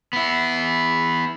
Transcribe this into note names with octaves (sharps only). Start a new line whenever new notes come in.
B3 E4